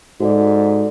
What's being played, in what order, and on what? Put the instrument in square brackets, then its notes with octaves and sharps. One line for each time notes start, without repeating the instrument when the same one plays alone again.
[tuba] G#2 [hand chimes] F#4 A4 D5